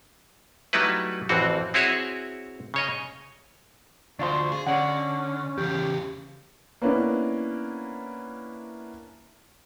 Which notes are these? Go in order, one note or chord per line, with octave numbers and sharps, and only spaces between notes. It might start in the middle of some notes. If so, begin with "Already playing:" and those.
F#3 G3 A3 D#4 E4 B4
A1 F2 E3 C4 F#4
C4 E4 F#4 G#4 C#5 E5
C#3 C#5 D#5
D2 D4 F4 C5 C#6
G#4
D3 C#4 C#5 D5 F#5
E2 C#3 G4
A#3 B3 C#4 D4 E4